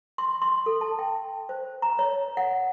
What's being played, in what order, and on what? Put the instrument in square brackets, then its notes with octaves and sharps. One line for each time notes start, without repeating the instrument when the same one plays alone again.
[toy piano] C6
C6
A4
A5
G5
C5
A#5
C#5
F#5